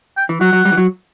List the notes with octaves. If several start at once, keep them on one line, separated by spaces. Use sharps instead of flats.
G5
E3
F#3 F#5
F#3
G3
E3
F#3